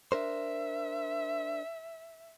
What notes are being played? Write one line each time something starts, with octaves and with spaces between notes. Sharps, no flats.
D4 A#4 C5 E5